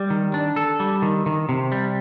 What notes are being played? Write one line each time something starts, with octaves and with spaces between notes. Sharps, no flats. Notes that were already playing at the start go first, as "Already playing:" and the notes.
Already playing: G3
D#3
D4
A4
G3
D#3
D#3
C3
G3